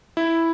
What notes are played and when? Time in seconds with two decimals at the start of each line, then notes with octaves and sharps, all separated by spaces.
0.17 E4